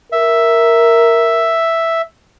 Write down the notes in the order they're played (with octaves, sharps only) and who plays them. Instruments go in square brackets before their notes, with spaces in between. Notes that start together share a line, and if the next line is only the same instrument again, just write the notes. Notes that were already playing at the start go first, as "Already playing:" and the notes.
[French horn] A#4 [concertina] E5